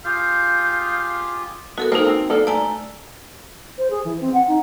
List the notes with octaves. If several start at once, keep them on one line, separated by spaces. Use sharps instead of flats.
F4 G4 G#4 F5 G6
B3 F#4 A4 A#4
A#3 D#4 A4 A#4 C5
C4
A#3 D4 A4
A3 D5 G#5 A#5
C5
G#4
E3
C4
F#5
D#4